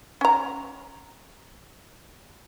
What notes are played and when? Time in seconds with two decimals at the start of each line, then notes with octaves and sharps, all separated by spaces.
0.21 C#4 A#5